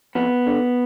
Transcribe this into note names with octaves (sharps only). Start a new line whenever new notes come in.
F2 B3
D3